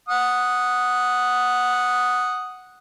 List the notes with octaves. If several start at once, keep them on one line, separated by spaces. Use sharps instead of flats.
F#5 D#6